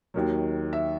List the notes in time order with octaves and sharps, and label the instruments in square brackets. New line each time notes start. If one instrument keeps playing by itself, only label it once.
[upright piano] D#2 D#3 F#3
E5